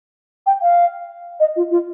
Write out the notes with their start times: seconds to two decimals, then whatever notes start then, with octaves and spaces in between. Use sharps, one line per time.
0.46 G5
0.62 F5
1.40 D#5
1.56 F4
1.71 F4